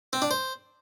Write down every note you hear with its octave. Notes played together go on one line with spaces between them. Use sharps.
C4
D4
C5